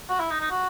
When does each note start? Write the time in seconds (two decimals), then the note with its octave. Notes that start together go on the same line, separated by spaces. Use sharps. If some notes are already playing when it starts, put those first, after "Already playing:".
0.09 F#4
0.20 E4
0.31 D#4
0.41 D#4
0.51 F#4